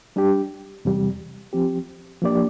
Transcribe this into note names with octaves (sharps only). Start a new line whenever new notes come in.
G3 D4 G4
E2 C3 G3
F3 C4 G4
F3 A#3 D4 G4 D5